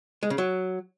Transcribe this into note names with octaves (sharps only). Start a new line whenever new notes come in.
G#3
C#3
F#3